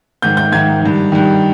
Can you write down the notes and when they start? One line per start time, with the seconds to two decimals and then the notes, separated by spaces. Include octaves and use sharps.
0.22 G#2 D#3 G6
0.37 G6
0.52 G#2 D#3 G#6
0.82 G2 D#3
1.12 G2 D#3